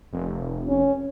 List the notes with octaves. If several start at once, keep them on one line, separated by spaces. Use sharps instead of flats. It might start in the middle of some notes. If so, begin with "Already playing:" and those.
F1
C#4